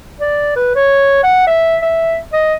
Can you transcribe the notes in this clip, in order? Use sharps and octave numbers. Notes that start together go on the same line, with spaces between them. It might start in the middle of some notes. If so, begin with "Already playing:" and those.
D5
B4
C#5
F#5
E5
E5
D#5